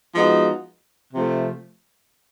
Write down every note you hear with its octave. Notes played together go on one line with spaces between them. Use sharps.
F3 G#3 B3 D#4 F#4
C3 F3 A3